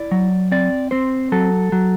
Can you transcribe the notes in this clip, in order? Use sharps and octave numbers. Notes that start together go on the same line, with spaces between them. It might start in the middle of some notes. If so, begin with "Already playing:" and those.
Already playing: E4 D5
F#3
C4 D5
C4 C5
F#3 A4
F#3